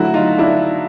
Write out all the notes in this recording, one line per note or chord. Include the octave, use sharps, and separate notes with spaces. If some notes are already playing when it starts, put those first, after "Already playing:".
Already playing: D3 F#3 A3 E4 F#4
D#4 F4
D4 E4